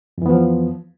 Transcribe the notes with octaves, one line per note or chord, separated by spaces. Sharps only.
F2 E3 F3 B3